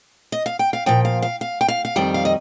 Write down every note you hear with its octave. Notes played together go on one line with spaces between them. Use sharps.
D#5
F5
G5
F5
A#2 F3 G5
F5
F5
F5
G5
F5
F5
F2 D#3 G3 G5
F5
D#5